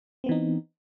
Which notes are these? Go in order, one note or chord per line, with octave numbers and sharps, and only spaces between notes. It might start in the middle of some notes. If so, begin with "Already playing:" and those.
E3 B3 C4 D#4